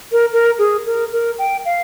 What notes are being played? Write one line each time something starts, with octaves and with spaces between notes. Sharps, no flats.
A#4
A#4
G#4
A#4
A#4
G5
F5